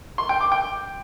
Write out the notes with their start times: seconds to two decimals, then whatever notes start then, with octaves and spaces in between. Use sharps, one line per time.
0.18 C6
0.29 G5
0.41 D6
0.52 G5